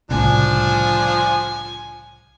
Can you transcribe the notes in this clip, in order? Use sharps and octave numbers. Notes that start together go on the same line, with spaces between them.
C2 A2 C#3 F3 D4 G#5